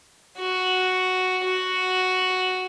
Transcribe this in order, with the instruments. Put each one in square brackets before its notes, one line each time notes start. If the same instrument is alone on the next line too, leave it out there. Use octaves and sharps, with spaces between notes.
[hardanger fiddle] F#4
F#4